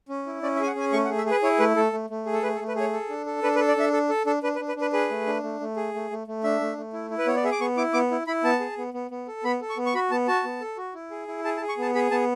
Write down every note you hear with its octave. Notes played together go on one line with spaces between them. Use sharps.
C#4
E4
C#4 D5
E5
G#4 G#5
F#5
C#4 G#5
A3 C#6
F#5
G#4
E5
G#4 B4
E4 C#5
A3 B4
A3 A4
A3
A3
G#4
A4
A3 B4
A4
A3
B4
G#4 C#5
A4
D4
A4
D4 B4
B4
A4
D5
D4 E5
A4
A4
D4 A4
D4 B4
B4
D4
B4
D4
B4
G#4 B4
A3
D4
A3
A3
G#4
A3
A3
A3
D4 E5
A3
A3
E4
E4
B4
B3 C#5
D5
G#4 E5
D6
B3 C#6
E4 D6
B3 D6
E4
E4 B5
B3 A5
G#4
B3
B3
B3
A4
B3 B5
A4
C#6
B3
C#6
F#4 B5
B3 A5
F#4 A5
B3
A4
F#4
E4
G#4
E4
G#4 A5
A5
G#4
C#6
B3 A5
G#4 B5
B3 A5